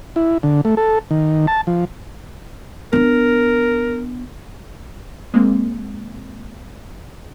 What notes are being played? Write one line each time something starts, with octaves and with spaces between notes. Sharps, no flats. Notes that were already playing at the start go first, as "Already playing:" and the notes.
E4
D3
A3
A4
D#3
A5
F3
B3 D4 A#4
G#3 A#3 C4